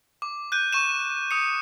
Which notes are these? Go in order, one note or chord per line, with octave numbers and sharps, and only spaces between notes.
D6
F#6 G6 D#7
C#6 D#7 E7
D#6 C#7